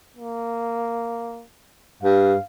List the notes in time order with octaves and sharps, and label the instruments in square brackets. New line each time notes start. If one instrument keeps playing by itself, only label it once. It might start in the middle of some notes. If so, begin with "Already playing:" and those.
[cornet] A#3
[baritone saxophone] G2 [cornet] F5